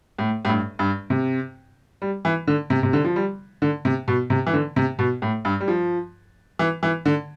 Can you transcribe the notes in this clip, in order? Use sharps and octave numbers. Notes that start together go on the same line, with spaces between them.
A2
A2
G2
G2
C3
G3
E3
D3
C3
C3
D3
F3
G3
D3
C3
B2
C3
E3
D3
C3
B2
A2
G2
G3
F3
E3
E3
D3